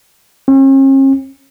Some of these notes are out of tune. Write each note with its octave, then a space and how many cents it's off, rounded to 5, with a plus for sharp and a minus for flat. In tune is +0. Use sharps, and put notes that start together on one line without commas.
C#4 -45